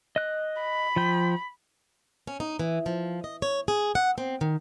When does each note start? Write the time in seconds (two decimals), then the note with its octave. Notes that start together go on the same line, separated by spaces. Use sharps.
0.16 D#5 F#6
0.61 B5
0.96 F3 G5
2.27 C#4
2.40 D#4
2.59 E3
2.86 F3
3.24 D#5
3.42 C#5
3.68 G#4
3.95 F#5
4.18 C4
4.41 D#3